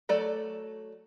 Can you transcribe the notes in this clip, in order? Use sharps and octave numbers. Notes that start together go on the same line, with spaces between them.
F#3 A3 A4 D5